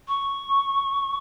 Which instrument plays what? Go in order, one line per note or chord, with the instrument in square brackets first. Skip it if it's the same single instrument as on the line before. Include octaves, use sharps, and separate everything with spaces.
[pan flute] C#6